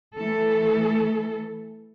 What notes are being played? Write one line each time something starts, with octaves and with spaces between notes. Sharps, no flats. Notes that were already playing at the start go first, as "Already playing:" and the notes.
E3 A3 A4